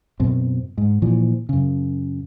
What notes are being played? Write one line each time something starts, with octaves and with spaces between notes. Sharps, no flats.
F#2 B2 C4
G#2
A#2 E3 F3
F#2 C#3